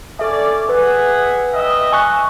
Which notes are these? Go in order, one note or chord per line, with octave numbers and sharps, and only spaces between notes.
C#4 A4 D5 E5
G#4 B4 E5 F#5
G3 D#5 E5
G#5 C#6 F#6